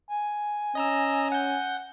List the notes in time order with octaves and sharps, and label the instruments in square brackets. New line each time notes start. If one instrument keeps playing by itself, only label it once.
[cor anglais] G#5
[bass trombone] C#4 [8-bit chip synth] D#5 A#5 E6
[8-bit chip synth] F#5 G6